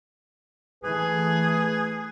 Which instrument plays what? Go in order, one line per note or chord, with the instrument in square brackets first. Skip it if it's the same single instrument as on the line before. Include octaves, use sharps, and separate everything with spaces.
[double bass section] E3 A3 [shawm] G#4 [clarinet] B4